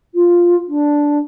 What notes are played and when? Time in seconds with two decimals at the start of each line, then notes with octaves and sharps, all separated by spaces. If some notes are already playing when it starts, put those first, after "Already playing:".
0.14 F4
0.68 D4